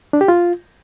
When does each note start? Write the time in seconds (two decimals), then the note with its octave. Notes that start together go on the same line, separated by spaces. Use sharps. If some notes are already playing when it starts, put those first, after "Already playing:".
0.13 D4
0.21 G4
0.28 F4